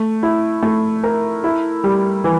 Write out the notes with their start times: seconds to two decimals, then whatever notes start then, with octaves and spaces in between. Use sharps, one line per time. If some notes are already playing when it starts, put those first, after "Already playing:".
Already playing: A3
0.23 E4
0.63 A3
1.04 A#4
1.44 E4
1.84 G3
2.24 E3